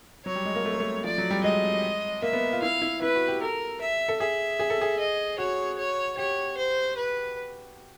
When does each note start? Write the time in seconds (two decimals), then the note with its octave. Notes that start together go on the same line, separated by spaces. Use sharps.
0.25 F#3 C#5
0.35 G3
0.45 G#3
0.55 A#3
0.65 A3
0.72 A#3
0.80 A3
1.04 F3 D5
1.18 F#3
1.30 G3
1.43 G#3 D#5
2.22 A#3 E5
2.33 B3
2.53 F4
2.62 E4 F5
2.82 E4
3.02 E4 B4
3.15 F#4
3.28 G4
3.41 A4 A#4
3.81 E5
4.08 A4
4.20 G#4 E5
4.59 G#4
4.70 A4
4.81 G#4
4.99 D#5
5.38 F#4 C#5
5.78 C#5
6.17 G4 C#5
6.57 C5
6.97 B4